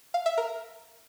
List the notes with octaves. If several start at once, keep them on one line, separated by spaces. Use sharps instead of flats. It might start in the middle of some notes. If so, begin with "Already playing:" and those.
F5
E5
A#4